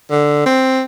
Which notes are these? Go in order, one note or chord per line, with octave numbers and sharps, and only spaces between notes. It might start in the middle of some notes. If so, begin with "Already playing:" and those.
D3
C4